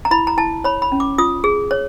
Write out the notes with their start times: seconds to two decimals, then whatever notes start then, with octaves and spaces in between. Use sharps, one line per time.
0.05 A#5
0.11 E4 B5
0.27 A#5
0.38 E4 A5
0.64 C#5 B5
0.82 B5
0.92 C#4
1.00 D6
1.18 F4 D#6
1.44 G#4
1.71 C#5